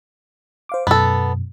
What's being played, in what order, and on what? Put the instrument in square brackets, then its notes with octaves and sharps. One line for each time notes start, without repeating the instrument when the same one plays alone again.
[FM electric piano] C5 F5 D6
[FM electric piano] F#2 B2 [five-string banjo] B3 A4